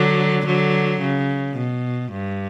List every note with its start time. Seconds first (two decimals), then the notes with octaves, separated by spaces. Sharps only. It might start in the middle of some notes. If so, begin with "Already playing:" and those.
Already playing: D3 F#3
0.46 D3 F#3
1.01 C#3
1.57 B2
2.12 G2